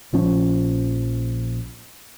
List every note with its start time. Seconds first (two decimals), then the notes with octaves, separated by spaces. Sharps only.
0.13 A#1 F3 C#4